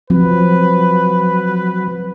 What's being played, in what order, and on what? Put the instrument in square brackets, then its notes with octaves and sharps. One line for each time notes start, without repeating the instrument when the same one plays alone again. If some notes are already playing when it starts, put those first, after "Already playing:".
[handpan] F3 C4 [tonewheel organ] F#3 [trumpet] B4